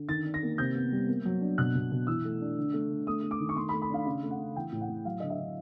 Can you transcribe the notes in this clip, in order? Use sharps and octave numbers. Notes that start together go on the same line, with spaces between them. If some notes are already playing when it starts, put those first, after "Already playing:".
Already playing: D3
D#3 A6
D4
A#6
A#3
C3 G6
B3
G3
A#3
F#3
D4
B2 F#6
B2
B2
E3 E6
A3
D4
D3
A3
D3
A3 D#6
A3
D6
D#3
C#6
A3 C6
B5
A3
B5
D4 F5
C#3 F5
A3
F#5
C#3
E3 G5
A2
F#5
A2
F#3 F5
D3 D#5
E5
D3